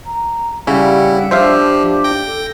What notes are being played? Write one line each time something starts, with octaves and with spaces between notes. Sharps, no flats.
A#5
C#3 G3 C#4 E4 F#5
F3 D4 G4 C5 E5 F5
G5 A#6
A4